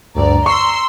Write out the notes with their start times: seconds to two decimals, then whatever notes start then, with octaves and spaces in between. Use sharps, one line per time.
0.15 D2 G2 D5 A#5
0.46 C6 C#6 E6 C7